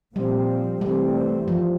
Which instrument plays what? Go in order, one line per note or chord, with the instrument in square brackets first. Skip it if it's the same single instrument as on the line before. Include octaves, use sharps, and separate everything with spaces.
[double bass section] A#2 F3 C4 [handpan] G3
[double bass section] C2 C3 E3 A3 C4 [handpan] G3
[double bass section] G2 [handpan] F3